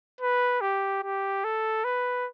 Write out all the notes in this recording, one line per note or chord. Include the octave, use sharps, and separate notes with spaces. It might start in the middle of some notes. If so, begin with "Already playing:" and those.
B4
G4
G4
A4
B4